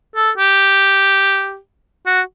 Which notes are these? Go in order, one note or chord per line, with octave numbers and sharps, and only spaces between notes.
A4
G4
F#4